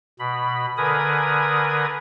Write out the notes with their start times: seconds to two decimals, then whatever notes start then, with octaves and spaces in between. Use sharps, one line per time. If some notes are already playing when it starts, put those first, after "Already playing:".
0.19 B2 B5
0.78 D3 A#4 B4 G#5 D#6